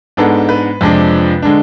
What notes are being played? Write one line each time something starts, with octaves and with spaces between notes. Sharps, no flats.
G#2 G#3 B3 D4 A4
B4
F2 C3 F3 G#3 D4
D3 G#3 D4